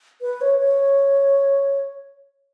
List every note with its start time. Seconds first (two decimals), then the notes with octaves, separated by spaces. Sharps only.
0.21 B4
0.41 C#5
0.59 C#5